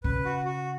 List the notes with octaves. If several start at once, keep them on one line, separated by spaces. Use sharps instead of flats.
C#3 B4
F#4
F#4